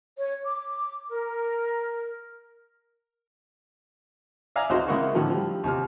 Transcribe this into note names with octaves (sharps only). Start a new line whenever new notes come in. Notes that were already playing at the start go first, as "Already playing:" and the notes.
C#5
D6
A#4
D5 E5 F5 G#5 A#5
C#2 G#3 D#4 F#4 C5
C#3 G#3 A#3 E4 F#5 C#6
A2 D3 D#3 F3 F#3
F3 G3
D#2 C3 F6